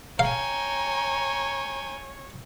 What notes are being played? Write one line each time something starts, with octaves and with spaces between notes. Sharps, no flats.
C#5 F5 G5 G#5 A#5